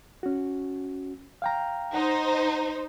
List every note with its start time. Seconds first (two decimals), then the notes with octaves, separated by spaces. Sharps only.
0.23 C#4 F#4
1.42 F5 G5 A#5
1.94 D#4 C5 F#5